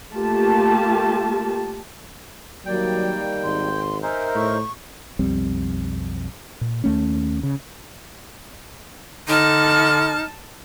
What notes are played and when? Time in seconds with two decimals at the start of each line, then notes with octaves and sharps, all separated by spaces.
0.14 A3 A#3 F4 G4 A5
2.66 D#3 F#3 G3 A#3 D5 G5
3.44 G#1 C6
4.03 D#4 A#4 C5 E5 G#5
4.35 A2 C#6
5.19 B1 F2 G3 C4
6.61 A#2
6.84 D#2 A3 C#4
7.43 C#3
9.29 D3 D#4 A5 F6